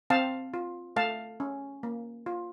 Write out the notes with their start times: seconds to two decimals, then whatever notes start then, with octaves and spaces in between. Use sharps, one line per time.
0.10 C4 F5 A5
0.54 F4
0.96 A3 F5 A5
1.40 C#4
1.83 A#3
2.26 F4